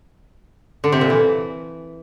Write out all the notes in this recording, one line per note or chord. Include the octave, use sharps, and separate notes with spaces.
D3
C3
A#2
E3